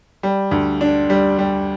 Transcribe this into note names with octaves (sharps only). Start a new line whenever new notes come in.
G3
D2
D4
G3
G3